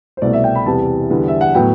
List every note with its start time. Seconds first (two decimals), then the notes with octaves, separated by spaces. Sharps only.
0.17 C5
0.22 C2 B2 A3 D5
0.33 E5
0.44 G5
0.55 B5
0.66 E2 C3 E3 G3 B3 A5
1.10 E2 D3 G3 B3
1.28 E5
1.41 F#5
1.55 A2 F#3 B3 G5